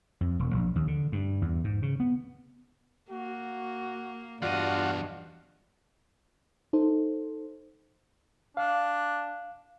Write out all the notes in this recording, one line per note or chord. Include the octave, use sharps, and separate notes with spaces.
F2
E1
A#1
D#2
D3
G2
E2
G#2
C#3
B3
A#3 F#4
E2 G2 F4 F#4 D5 D#5
D#4 A4 C5
D4 F5